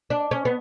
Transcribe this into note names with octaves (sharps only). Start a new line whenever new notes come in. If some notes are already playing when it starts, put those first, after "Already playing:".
D4
C#4
B3